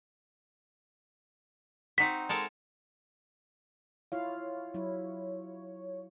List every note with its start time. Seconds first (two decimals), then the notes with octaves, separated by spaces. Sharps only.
1.98 C4 D#4 F#4 B6
2.29 G#3 A4 A#4
4.12 E4 F4 C#5 F5
4.74 F#3 E4